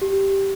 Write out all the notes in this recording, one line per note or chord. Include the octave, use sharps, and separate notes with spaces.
G4